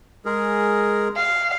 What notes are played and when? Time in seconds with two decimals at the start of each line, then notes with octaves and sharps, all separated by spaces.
0.25 G#3 G#4 A#4
1.16 F5